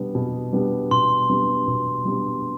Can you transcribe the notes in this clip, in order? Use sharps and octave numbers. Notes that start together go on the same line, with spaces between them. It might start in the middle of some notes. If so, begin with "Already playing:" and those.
Already playing: B2 G3 B3 D4
B2
G3 B3 D4
B2 C6
G3 B3 D4
B2
G3 B3 D4